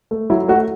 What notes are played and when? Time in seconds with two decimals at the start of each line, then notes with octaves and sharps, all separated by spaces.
0.11 A3
0.30 F#3 E4
0.48 A3 F#4